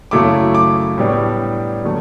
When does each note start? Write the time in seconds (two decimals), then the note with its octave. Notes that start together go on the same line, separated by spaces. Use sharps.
0.11 F#2 C#3 F#3 A3 E4 D6
0.55 D6
0.98 A2 G3 B3 D4
1.85 D3 F#3 A3